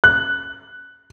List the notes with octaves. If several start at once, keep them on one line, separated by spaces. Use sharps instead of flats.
F#6